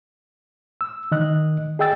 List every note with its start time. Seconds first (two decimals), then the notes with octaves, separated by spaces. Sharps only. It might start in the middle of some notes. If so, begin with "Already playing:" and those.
0.81 E6
1.12 D#3 D#5 F#6
1.79 G#4 D#5 G5 E6 A6